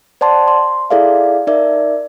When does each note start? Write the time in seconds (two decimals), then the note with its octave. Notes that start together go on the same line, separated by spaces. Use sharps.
0.21 C5 D5 F#5 A5 C6
0.48 C6
0.90 E4 G#4 A4 D5 E5 F5
1.47 D#4 A#4 D5 E5